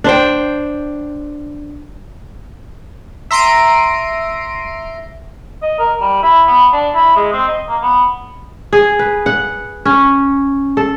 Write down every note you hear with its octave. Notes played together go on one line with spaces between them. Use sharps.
D4 C5 G5
E5 A#5 C6 C7 D7 D#7
D#5
A#4
G3
E4
B3
D4
E4
G#3
C4
D#5
A#3
B3
G#4
B4
F#5
C#4
A4